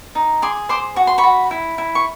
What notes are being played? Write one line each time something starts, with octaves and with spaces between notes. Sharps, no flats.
D#4
G#4 C6 D6
C5 C6 D6
F#4 C#6
C6
B5 C#6
F#4
E4
E4
C#6